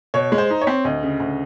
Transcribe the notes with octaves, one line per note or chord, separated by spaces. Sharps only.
B2 C#5
G#3
C5
D#4
C#5
C4
D2 D#5
C#3
D2